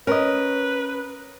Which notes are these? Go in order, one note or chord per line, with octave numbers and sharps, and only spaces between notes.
C#4 A#4 B4 D#5